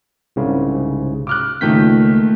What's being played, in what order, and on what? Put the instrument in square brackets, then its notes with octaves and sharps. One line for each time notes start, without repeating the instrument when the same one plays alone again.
[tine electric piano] C2 G#2 C#3
[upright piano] D6 F6 F#6
[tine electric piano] C#2 G6 B6 [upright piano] A#2 D#3 A3